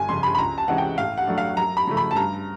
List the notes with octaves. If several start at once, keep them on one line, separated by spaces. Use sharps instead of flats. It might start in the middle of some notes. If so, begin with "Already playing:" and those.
Already playing: G1 G#5
F2 C#3 C6
B5
B5
C#2 A#5
A5
C3 E3 G#3 C#4 F#5
G5
A2 F5
F#5
F#3 A3 D4
F5
F#2 A#5
B5
C#3 F3 A3
B5
A5
G2 A#5